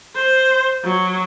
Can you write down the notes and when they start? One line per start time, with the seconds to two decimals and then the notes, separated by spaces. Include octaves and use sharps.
0.16 C5
0.84 F#3